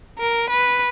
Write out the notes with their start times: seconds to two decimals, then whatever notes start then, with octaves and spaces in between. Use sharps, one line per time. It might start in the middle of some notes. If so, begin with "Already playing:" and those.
0.18 A#4
0.49 B4